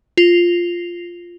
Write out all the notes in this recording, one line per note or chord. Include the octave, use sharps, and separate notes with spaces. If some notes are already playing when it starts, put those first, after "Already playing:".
F4